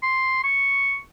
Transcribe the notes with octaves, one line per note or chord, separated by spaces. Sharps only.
C6
C#6